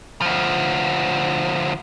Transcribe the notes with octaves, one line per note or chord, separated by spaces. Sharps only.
D2 F3